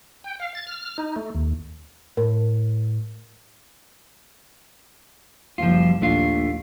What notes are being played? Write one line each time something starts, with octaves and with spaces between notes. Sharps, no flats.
G5
F5
A6
F6
D#4
A3
D#2
A2 A#4
F#1 F3 G3 F4
A#1 D#2 A3 D4 F4